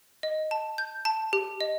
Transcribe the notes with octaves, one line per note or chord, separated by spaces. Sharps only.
D#5
A5
G6
A5
G4
D#5